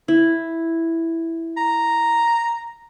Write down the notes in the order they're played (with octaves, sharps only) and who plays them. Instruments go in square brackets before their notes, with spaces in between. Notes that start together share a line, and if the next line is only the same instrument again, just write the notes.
[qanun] E4
[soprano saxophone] A#5